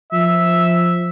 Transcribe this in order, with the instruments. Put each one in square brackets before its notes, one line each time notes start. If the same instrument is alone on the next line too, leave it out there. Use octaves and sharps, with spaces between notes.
[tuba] F3 [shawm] E5